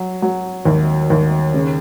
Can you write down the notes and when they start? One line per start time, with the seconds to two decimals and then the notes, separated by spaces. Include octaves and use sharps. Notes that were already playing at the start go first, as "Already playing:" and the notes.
Already playing: F#3
0.22 F#3
0.65 D#2
1.10 D#2
1.54 C#3